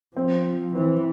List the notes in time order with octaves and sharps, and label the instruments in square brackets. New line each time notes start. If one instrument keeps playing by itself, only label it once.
[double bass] F3 [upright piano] C4
[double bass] E3 [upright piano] C4